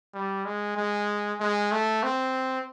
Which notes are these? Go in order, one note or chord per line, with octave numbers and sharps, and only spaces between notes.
G3
G#3
G#3
G#3
A3
C4